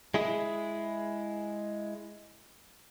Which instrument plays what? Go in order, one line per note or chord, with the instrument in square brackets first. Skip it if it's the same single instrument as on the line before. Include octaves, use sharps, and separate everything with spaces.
[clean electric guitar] G#3 E4 G#4